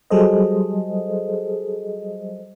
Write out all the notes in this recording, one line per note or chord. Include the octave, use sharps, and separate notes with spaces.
F#3 G3 G#4 A4 C5 D#5